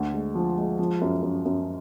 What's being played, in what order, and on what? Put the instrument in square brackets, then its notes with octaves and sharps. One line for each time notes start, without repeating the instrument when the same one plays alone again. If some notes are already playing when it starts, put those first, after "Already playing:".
Already playing: [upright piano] D2
G#3
F3
G#3
F3
F#2
F#2
F#2